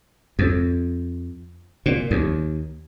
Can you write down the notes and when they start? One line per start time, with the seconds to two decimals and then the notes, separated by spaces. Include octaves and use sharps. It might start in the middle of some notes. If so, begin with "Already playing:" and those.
0.39 F2
1.86 A#2
2.11 D#2